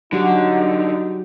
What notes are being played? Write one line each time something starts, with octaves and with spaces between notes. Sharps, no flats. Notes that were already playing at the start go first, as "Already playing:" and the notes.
D3 F#3 D#4 F#4 G4